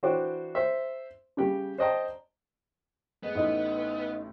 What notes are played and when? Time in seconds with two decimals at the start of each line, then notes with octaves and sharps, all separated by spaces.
0.03 E3 D4 F#4 C5 G5 D6
0.55 C5 E5
1.37 C#3 G3 G4 G5
1.78 C5 D5 D#5 G5 A5 A#5
3.23 G#3 B3 D#5
3.35 A1 A2 D#4 D#5